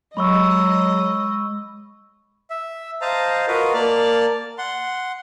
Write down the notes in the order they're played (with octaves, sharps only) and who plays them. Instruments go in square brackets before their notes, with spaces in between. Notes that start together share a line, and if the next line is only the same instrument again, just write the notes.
[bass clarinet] F#3 [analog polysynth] G#3 [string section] D#5 [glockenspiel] B5 C#6 E6
[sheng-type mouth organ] E5
C5 D#5 F5 A5 A#5
F4 F#4 A#4 B4 D#5 F5
A#3 D5 A5 F6
F#5 C6